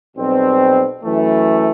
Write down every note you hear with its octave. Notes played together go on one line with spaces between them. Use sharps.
B1 B2 G3 C4
F#2 E3 A3